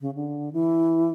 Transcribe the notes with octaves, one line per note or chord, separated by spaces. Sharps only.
C#3
D3
E3